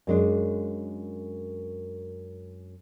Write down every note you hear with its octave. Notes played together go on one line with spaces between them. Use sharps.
F#2 G#3 D4